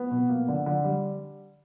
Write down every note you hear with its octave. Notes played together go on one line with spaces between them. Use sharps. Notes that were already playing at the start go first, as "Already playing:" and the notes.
Already playing: B3
B2
A#3
D3
D3
G3